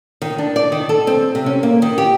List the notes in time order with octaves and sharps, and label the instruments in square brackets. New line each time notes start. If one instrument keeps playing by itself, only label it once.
[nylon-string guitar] D#3
D4
D5
D#3
A4
C4
C3
C#4
A#3
D#3
G4